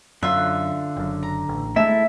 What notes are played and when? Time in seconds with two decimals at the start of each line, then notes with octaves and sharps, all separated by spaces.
0.23 F#2 D3 F4 E5 F#6
0.97 F#1 F#2
1.23 A#5
1.49 A1
1.76 G#3 A3 E4 A4 E5 A5